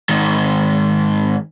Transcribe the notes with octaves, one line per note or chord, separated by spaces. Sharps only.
G#2 D#3